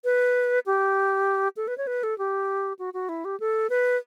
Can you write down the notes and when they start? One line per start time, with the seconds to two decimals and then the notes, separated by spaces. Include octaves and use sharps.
0.04 B4
0.66 G4
1.57 A4
1.68 B4
1.78 C#5
1.87 B4
2.03 A4
2.18 G4
2.79 F#4
2.94 F#4
3.09 E4
3.25 G4
3.40 A4
3.70 B4